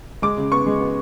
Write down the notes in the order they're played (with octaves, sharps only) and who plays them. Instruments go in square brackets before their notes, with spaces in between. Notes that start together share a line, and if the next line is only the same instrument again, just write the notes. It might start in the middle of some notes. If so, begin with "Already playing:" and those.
[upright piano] G#3 D6
C#3
B3 C#6
G#3
B3